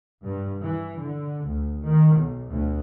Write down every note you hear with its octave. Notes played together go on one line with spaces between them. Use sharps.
G2
E3
D3
D2
D#3
B1
D2